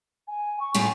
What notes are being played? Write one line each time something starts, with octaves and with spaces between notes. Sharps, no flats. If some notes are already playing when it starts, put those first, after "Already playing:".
G#5
C#6
A2 A3 F4 G#5